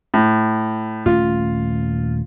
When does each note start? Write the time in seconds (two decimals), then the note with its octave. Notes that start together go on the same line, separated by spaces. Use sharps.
0.14 A2
1.06 D#1 A3 C#4 F4